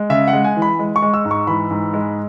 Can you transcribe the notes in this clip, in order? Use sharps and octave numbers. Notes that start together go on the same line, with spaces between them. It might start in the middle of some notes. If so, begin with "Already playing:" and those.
Already playing: G#3
C#3 E5
F#5
G#3
G#5
E3
B5
G#3
C#6
G#3
E6
G#2
C#6
E3 B5
G#2
G#3